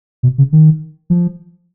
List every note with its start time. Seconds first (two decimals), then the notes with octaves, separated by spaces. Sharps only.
0.23 B2
0.38 C#3
0.53 D#3
1.10 F3